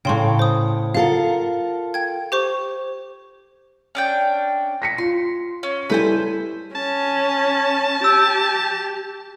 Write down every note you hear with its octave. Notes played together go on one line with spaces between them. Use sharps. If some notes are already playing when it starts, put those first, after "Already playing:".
A2 C#3 G5 C6 C#6
C5 D#6
F4 A4 A#4 F5 F#5
G5 G#6
G4 C5 C#6
C#4 D4 G5
A#6 B6 C#7
F4 C6
C#4
G3 E4 A4 B4 C5 G#5
C#4 A5
G4 E6